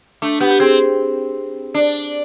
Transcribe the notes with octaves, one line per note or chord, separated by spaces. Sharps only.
A3 D4
B3 G4
G4
C4 G#4
D4